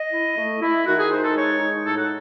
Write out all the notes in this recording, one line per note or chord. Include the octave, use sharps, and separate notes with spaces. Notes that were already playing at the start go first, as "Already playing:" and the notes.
Already playing: D#5
E4
A3
E4
D#3 F#4
G#4
D#4 C5
A4
G#3 C#5
D#4
A2 A4
F#4